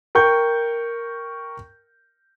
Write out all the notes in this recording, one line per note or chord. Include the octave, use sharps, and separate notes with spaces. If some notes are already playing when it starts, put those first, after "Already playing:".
A#4 G5 C#6 G6